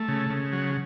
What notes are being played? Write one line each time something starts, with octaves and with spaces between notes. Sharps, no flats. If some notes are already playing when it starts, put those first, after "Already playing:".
Already playing: A3
C#3
C#3
F#3